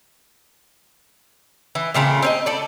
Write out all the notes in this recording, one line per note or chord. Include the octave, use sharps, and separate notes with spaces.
E3
A#2 C#3 A3 C4
C4 C#5 D#5
A4 D5